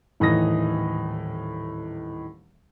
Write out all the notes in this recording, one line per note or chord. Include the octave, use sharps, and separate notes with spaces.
D#1 A2 E3 D#4 D#6 A#6